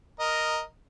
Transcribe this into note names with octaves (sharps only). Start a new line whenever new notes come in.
A#4 D#5